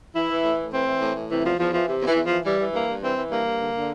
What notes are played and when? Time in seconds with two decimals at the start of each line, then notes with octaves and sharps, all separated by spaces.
0.15 E3 E4
0.30 E3
0.44 A2
0.58 A2
0.72 E3 C4
0.87 E3
1.01 A2
1.15 A2
1.30 C3 E3
1.43 E2 F3
1.58 E2 F3
1.73 E3 F3
1.87 C3
2.02 E2
2.07 E3
2.15 E2
2.25 E3 F3
2.44 E3 G3
2.59 E3
2.73 G2 A#3
2.87 G2
3.02 E3 C4
3.16 E3
3.31 G2 A#3
3.45 G2
3.59 D3
3.73 D3